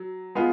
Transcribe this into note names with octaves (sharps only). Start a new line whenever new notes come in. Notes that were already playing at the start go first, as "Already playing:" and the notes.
Already playing: F#3
G#3 B3 F4